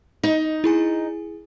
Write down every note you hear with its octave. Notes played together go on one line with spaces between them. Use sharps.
D#4 D#5
E4 G#4 G#5